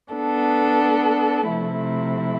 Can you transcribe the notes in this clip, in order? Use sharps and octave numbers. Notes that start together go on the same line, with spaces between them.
B3 D4 A4
C3 F3 A3 E4